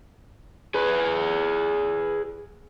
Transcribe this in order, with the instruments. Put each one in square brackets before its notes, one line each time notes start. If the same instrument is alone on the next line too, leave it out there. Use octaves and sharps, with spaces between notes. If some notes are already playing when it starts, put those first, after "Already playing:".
[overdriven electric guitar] G#4 B4